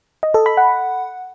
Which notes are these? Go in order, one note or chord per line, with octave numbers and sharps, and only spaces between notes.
D#5
A4
B5
F#5